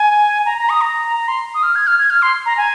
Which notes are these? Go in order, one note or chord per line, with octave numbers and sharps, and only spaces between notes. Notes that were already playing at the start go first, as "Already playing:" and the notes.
Already playing: G#5
A#5
A#5
D#6
A#5
A#5
C6
D#6
F6
G#6
F6
G#6
F6
C6
A#5
G#5